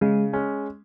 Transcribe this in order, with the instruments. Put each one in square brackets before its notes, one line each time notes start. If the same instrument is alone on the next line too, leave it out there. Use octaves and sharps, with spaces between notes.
[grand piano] C#3 [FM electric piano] G#3
[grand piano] G#3 C#4